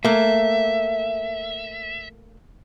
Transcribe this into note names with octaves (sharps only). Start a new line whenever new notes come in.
A3 A#3 E5